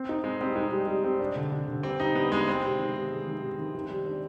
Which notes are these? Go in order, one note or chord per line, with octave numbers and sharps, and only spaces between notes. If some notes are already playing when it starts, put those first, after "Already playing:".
Already playing: C4
D#4
G#3 C4
G3 C4
G#3 D#4
G3
G3
C4
D4
D3
D3
D3
G2 C4
G2 D#4
G2 B3
G2 G#3
G#3 C4
C3
D#3
C3
G#3
D#3
C3
D#3
D#3
G3
D4